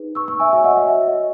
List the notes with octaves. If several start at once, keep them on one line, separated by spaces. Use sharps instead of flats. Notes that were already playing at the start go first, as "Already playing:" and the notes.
Already playing: D#4 G#4 B4
C#6 E6
C#6 E6
E5 G#5
F#4 C#5 E5 G#5
D#5 F#5
E5
E5
D#5